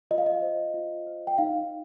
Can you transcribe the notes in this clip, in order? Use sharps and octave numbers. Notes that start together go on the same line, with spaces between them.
F4 D#5
F5
D#5
C5
F4
C5
G5
D#4 F5